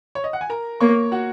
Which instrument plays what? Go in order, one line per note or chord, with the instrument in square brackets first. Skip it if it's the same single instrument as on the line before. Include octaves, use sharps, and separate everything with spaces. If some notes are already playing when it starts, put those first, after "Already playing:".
[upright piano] C#5
D#5
F#5
G#5
A#4 A#5
[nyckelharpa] A#3 [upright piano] C#5 C#6
[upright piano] F#4 F#5